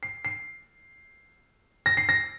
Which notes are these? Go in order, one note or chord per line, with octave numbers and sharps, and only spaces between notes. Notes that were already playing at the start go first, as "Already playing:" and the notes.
C7
C7
A#6
C7
A#6